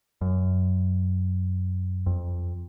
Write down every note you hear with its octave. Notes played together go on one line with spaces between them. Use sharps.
F#2
F2